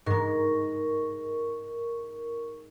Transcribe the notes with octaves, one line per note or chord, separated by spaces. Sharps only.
G#2 G#3 A#4 C#6